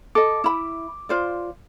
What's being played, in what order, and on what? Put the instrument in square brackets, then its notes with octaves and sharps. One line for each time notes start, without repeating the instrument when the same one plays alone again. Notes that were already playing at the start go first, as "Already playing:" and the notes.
[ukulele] A4 D#5 [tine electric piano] D6
[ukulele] E4 B5
F4 C5 D5